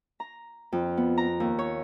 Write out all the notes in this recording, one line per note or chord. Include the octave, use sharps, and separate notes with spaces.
A#5
F2
B3
A#5
D#2
C#5